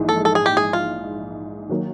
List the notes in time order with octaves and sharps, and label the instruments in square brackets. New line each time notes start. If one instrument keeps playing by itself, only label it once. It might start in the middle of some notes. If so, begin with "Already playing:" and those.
Already playing: [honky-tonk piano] A#1 G#2 E3
[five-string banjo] A4
A4
G#4
G4
G#4
F4
[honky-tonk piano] D#3 F#3 A#3